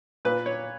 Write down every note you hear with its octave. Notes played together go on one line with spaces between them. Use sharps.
A#2 B4
C#5